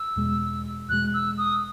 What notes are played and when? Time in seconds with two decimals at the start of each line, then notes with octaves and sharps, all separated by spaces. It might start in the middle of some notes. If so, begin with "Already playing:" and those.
Already playing: E6
0.16 E2 B2 G#3
0.89 E2 B2 G#3 F#6
1.14 E6
1.38 D#6